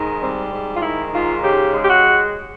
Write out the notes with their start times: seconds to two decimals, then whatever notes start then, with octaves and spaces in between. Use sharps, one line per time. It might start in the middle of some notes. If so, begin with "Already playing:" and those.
Already playing: G#2 D#3
0.21 G3 C4
0.52 G#2
0.76 F4
0.82 D#3 E4
1.12 G#2 F4
1.42 C#3 G4
1.73 G#3
1.82 G4
1.89 F#4